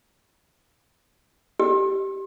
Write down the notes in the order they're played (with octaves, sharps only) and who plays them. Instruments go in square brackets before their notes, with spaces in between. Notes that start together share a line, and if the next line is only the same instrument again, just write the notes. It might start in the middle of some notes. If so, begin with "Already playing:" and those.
[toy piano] G4